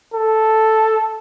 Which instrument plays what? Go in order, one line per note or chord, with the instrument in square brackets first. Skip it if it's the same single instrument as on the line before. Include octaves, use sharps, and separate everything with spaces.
[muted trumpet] A4